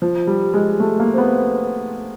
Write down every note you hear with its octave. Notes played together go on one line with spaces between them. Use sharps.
F3
G3
G#3
A3
A#3
C4
B3
C4